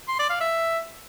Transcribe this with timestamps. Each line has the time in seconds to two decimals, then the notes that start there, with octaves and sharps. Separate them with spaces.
0.08 C6
0.19 D5
0.30 F5
0.41 E5